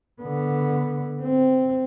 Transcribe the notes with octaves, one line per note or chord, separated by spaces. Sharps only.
D3 B3
C4